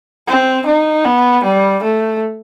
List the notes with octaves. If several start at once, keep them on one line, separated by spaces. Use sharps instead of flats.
C4
D#4
B3
G3
A3